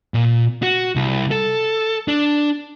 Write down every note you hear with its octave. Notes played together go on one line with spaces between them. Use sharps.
A#2
F#4
C2
A4
D4